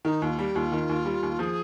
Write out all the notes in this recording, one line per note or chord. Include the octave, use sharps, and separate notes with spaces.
D#3 D#4
D#2 F4
G3 G4
D#2 F4
D#3
D#2
G3
D#2
F3 G#4